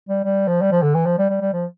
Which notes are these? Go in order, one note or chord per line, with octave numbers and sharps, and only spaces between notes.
G3
G3
F3
G3
F3
D3
E3
F3
G3
G3
G3
F3